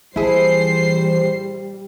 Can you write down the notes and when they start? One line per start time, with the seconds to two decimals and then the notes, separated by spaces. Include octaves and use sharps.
0.16 A#1 E3 G3 E4 G#4 C5 C7